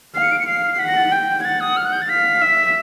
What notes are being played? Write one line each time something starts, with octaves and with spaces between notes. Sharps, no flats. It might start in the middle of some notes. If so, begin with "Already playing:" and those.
F5 C7
C#7
D7
C#7
F5 C7
C7
F#5 B6
A#6
A6
G5
G#6
F#5 A6
D#6
F6
F#6
G6
A6
F5 B6
E5